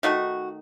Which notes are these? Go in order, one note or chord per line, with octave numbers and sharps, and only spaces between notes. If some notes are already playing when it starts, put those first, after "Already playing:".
D#3 A3 D#4 F#4